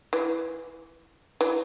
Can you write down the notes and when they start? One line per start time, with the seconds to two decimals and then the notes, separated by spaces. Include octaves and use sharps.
0.13 E3
1.41 E3